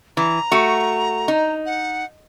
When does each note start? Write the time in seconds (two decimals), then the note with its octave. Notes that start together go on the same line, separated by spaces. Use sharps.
0.17 E3 A#5
0.52 A3 F#4
1.28 D#4
1.66 F#5